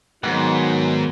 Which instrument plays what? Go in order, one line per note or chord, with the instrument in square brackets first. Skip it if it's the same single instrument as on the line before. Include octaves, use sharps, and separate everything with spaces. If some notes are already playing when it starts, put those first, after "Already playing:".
[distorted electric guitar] G#2 [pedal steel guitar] D#3 B3 F#5 [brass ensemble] F#3 D#4